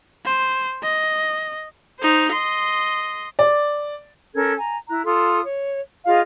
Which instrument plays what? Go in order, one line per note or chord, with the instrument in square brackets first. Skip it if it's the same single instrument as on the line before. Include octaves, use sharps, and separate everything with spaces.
[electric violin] C5
D#5
[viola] D#4 C5
D#5 C6
[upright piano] D5
[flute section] C#4 A4 A#4 G#6
G#5 A#5
E4 A#5 F#6
F4 A4 C6 D#6
C#5
F4 G#4 D#5 F5